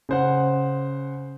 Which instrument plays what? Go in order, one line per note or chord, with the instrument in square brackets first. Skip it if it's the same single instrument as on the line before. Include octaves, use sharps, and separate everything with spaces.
[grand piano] C#3 C5 F#5